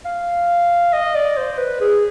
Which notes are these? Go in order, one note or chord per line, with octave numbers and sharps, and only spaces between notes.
F5
D#5
D5
C5
B4
G#4